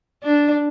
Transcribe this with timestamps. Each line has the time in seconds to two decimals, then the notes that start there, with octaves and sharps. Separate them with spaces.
0.23 D4